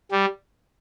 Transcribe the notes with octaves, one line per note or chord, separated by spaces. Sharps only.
G3